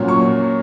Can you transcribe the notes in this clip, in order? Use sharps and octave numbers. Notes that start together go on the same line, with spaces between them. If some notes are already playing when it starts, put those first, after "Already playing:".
Already playing: A#2 F#3 A#3 C#4
C#6